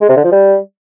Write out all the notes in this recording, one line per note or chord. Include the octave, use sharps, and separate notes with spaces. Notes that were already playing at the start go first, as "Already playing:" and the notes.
G#3
C3
D3
F3
G3